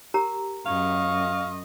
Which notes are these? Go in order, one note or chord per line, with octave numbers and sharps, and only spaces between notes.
G4 A#4 A#5
F#2 D#5 F5 C#6